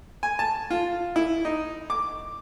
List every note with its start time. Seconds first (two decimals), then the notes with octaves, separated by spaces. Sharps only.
0.23 G#5
0.39 A5
0.71 F4
1.16 E4
1.45 D#4
1.90 D6